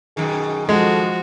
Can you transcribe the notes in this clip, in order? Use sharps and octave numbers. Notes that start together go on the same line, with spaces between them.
F#2 B2 D#3 G#4
F3 G#3 F#4 A4